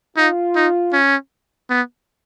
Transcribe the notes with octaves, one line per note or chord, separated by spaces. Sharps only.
D#4 F4
D#4
C#4
B3